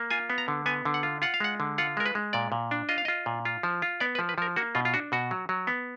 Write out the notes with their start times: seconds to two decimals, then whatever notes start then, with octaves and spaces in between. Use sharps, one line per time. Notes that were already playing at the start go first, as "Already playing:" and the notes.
Already playing: A#3
0.11 F4 G#5
0.30 B3
0.38 A#5
0.48 D3
0.66 B3 G#5
0.85 D3
0.94 F#5
1.03 F4
1.22 F4 F#5
1.34 F5
1.40 G#3 F#5
1.60 D3
1.78 F4 F#5
1.97 G#3 A#4
2.06 B4
2.15 G#3
2.33 A#2 D5
2.52 A#2
2.71 D4
2.89 F4 D#5
2.98 F5
3.05 F4 D#5
3.26 A#2
3.45 F4
3.63 F3
3.82 F4
4.00 B3 D5
4.15 B4
4.19 F3
4.29 B4
4.38 F3 A#4
4.56 A#3 F#4
4.75 B2 F4
4.85 F4
4.94 D4 F#4
5.12 B2 F#4
5.31 F#3
5.49 F#3
5.67 B3